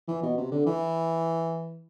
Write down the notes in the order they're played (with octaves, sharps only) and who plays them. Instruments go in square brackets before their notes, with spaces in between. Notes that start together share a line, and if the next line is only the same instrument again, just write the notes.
[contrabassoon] E3
B2
C3
D3
E3